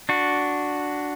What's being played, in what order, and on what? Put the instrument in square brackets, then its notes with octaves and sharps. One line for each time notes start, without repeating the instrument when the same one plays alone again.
[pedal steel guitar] D4 F#4